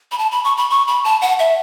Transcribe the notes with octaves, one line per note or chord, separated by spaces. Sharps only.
B5
A5
B5
C#6
B5
C#6
B5
A5
F#5
E5